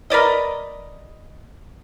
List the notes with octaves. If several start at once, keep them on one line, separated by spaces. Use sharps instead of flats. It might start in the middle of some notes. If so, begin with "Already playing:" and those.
A#4 B4 D5 D#5